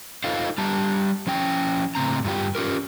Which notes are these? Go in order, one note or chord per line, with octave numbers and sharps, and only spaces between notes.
D#4 F4 A4 C5 D#5 F5
G3 G4 A5 A#5
F3 C#4 G5
A2 C#3 C4 A#5
G2 F4 G4
C#4 F4 G4 A#4